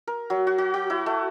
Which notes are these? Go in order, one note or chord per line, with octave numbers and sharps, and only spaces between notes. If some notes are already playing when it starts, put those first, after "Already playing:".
A#4
F#3
F#4
F#4
F#4
E4
A3